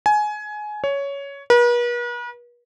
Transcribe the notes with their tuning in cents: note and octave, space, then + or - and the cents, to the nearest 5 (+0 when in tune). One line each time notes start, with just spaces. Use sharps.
G#5 +20
C#5 +10
B4 -45